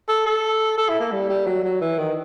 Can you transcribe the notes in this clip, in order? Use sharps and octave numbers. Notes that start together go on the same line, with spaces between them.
A4
A4
A4
E4
A#3
G3
G3
F#3
F#3
E3
D#3